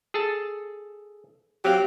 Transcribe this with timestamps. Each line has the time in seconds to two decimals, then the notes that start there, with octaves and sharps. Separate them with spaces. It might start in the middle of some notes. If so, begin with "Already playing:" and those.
0.14 G#4 A4 A5
1.65 F#3 C4 G4 F5